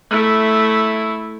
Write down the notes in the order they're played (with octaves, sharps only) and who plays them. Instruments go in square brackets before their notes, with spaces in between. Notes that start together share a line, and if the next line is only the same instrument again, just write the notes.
[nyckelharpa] A3 E4